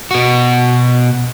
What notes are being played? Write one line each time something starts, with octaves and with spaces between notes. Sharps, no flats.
B2 F#4